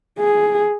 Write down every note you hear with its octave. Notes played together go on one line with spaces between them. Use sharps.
G#4